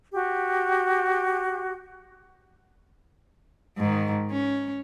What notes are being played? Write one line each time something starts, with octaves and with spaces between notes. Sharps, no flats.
F#4 G4
G#2 D#3
C#4